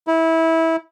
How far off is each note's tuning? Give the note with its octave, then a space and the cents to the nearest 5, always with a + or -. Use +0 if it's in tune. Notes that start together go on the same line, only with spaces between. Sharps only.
E4 -20